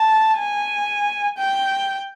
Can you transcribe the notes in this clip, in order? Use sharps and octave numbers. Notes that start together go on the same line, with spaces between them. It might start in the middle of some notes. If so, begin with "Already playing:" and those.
Already playing: A5
G#5
G5